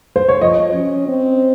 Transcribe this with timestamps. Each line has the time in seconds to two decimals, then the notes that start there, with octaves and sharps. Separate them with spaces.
0.16 C5
0.28 C#5
0.41 F3 D#5
0.74 C#4
1.08 C4